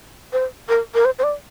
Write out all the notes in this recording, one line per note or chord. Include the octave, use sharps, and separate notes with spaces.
C5
A#4
A#4
C5
C5
D5